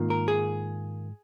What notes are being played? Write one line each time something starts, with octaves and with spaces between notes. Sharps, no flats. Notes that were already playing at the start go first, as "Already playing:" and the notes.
Already playing: G#2 D#3 A#3 F4
A#4
G#4